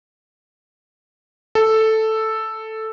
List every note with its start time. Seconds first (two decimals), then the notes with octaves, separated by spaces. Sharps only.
1.55 A4